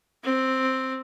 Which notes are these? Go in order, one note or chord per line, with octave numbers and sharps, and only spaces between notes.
C4